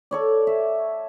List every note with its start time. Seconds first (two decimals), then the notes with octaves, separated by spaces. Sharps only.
0.11 A4 C#5 D5
0.47 E5